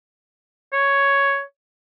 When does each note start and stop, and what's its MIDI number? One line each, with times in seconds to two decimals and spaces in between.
0.73 1.42 73